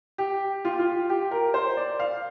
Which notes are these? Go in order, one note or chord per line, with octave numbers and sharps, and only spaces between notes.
G4
F4
G4
F4
G4
A#4
C5
D5
F5